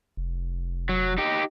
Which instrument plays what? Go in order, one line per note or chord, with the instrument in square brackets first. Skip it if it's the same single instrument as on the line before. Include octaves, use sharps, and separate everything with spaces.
[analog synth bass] F1
[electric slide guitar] F#3
D#4 G4